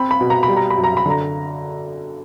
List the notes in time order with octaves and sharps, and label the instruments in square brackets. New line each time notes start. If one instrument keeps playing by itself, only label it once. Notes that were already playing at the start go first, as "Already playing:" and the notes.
Already playing: [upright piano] C4 B5
B5
B2
A#5
B5
G3
A#5
B5
F#2
A#5
B5
D3 A#5